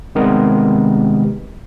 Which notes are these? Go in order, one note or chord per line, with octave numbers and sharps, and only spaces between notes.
C3 D#3 G3 G#3 B3 A#4